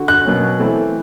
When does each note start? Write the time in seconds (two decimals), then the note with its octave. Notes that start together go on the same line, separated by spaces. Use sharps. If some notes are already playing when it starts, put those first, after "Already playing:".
Already playing: D3 F#4
0.08 F#6
0.25 B2 F#3 A#3 C#4
0.60 E3 A3 C4 E4 A4